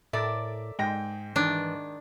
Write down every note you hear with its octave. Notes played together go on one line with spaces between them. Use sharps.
A2 A4 A#4 D5 E5 D6
G#2 G#3 G5 A#6
D#3 E3 G#3 D4